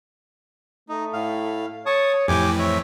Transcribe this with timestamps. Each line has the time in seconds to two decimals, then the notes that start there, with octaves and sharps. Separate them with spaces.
0.89 A3 D#4
1.13 A2 F5
1.86 C#5 A5 C#6 D#6
2.28 F2 A2 E3 G4 G#5 D6
2.59 C4 C#5 E5